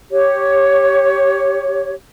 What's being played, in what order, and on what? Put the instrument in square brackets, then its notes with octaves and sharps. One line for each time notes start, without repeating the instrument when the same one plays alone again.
[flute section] G4 C#5